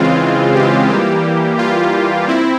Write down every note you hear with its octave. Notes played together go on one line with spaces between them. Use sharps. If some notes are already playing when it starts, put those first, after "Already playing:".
Already playing: C#3 E3 G#3 C4 F4
G4
E3 G3 A#3 G4
F4
C4 E4